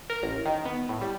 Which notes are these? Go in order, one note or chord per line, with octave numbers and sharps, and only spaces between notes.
A#4
A1
D#3
B3
A2
G3